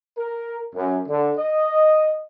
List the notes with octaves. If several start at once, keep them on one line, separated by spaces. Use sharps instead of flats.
A#4
F#2
D3
D#5